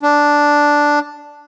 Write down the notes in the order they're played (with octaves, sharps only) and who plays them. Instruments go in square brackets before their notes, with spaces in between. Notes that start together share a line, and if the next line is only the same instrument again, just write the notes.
[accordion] D4